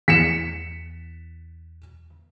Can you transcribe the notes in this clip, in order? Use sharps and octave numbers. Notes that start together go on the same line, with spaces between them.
E2 B6 C#7 E7